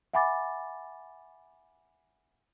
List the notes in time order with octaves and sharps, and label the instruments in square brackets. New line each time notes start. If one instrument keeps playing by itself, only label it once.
[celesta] E5 F#5 G#5 B5 D6 A6